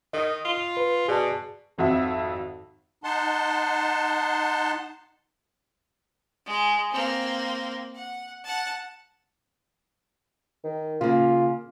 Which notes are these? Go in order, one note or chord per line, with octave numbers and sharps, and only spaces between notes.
D#3 D#5 D#6
F4
B4
B2 G#4 D5 A5
G#1 F2 F#4 E5
D#4 F#5 A5 C6
G#3
A#3 C4
F#5
F#5 A5
D#3
C#3 A#3 F4